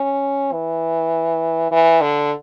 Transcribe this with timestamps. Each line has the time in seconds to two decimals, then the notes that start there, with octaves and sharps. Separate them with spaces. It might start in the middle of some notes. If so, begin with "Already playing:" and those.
Already playing: C#4
0.52 E3
1.71 E3
2.01 D3